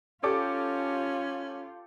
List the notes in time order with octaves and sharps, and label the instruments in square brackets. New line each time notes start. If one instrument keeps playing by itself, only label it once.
[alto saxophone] C#4 [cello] F4 [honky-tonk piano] G4 A4 D6